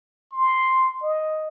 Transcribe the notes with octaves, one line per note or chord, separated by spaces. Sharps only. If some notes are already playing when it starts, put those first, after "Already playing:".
C6
D#5